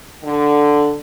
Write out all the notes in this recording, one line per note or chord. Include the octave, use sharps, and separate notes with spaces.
D3